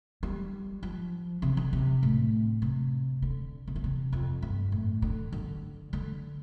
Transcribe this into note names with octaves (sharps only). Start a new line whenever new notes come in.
G3
F3
C3
D3
C3
A2
C3
D3
C3
D3
C3
F2
G2
A2
D3
D3
D3